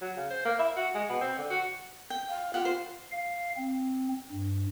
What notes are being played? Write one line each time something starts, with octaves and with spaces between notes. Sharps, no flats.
F#3
C#3
C5
A#3
E5
F#4
G#3
B2
C4
D3
F#4
G5
F5
F4 G4 F#5
C5
F5
C4
G2